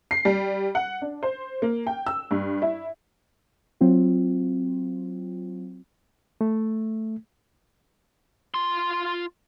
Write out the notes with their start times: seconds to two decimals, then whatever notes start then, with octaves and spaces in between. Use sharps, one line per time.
0.11 C7
0.25 G3
0.75 F#5
1.02 D4
1.23 C5
1.62 A#3
1.87 G5
2.07 E6
2.31 G2
2.62 E4
3.81 F#3 C4 F4
6.41 A3
8.54 F4 C6